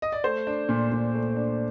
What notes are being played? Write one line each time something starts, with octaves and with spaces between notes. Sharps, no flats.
D#5
D5
A3 C5
D4
A#2
A#2
A3
D4